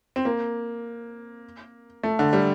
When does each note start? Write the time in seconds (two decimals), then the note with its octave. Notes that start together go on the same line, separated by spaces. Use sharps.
0.16 C4
0.25 A#3
2.03 A3
2.19 D3
2.33 G3